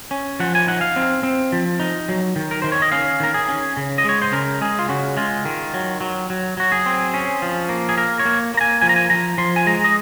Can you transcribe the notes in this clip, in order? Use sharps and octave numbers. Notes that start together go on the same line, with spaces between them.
C#4
F3 F#5
G#5
D#4 F#5
F5
C4
C4
F3
D#4
F#3
D#3
A#4
D#3 C5
C#5
D#5
C#4 F5
D#3 A#4
G#4
C#4
C#3
D#5
G#3 C#5
C5
C#3 A#4
G#3 G#4
F4
C#3 F#4
G#3 F4
D#3
F#3
F#3
F#3
F#3 F#4
G#4
C4
C#4
F3
A#3
G#4
A#3 A#4
C#5
A#3
A#3 A#5
G#5
F3 G#5
A#5
G#5
F3 A#5
F3 C6
G#5
G#3 A#5
D#5